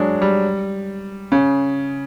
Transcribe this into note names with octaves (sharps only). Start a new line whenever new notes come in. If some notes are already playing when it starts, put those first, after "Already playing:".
Already playing: F#3 G#3 D4
G3
C#3